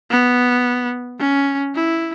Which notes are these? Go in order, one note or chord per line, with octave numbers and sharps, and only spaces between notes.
B3
C#4
E4